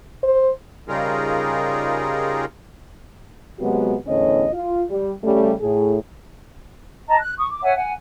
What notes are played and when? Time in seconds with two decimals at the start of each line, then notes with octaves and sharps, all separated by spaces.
0.23 C5
0.88 C#3 G3 D#4 F4 G#4 A#4
3.59 C3 F#3 G#3 B3 F#4 G4
4.06 E2 A2 D3 C#4 C#5 D#5
4.53 F4
4.89 G3
5.23 C#3 G3 A3
5.61 A2 G#4
7.07 D#5 A5 A#5
7.20 F#6
7.38 C#6 D#6
7.51 D6
7.62 C#5 E5 F#5 G#5
7.75 F#5 G#5